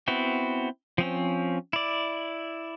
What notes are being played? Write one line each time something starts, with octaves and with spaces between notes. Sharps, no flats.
B3 C4 E4 F#4
F3 C4 C#4
E4 D5